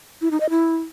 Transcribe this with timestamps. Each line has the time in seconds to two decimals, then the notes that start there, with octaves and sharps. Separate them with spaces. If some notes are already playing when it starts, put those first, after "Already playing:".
0.21 E4
0.31 D#4
0.40 D#5
0.50 E4